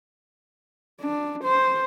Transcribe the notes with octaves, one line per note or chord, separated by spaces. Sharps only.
D4
C5